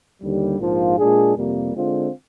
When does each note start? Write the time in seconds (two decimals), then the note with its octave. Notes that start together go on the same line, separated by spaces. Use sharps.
0.22 D#2 D3 G3
0.59 A#1 G#2 F3 A#3 F4
0.97 A#2 G#3 D4 G#4
1.35 F2 C3 G3 A#3
1.73 D3 G#3 C4 F4